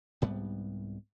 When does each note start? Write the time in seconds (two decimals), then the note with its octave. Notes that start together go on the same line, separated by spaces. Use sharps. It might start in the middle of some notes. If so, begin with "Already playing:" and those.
0.22 C2 G#2 G3 B3